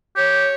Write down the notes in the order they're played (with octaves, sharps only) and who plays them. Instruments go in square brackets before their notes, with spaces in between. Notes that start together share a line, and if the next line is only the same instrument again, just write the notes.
[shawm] G4 [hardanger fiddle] C#5